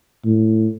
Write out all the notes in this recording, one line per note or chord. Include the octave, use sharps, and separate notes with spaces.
A2